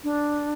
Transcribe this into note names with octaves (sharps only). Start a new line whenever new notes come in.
D4